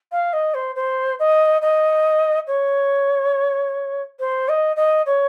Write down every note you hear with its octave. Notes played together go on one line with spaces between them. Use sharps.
F5
D#5
C5
C5
D#5
D#5
C#5
C5
D#5
D#5
C#5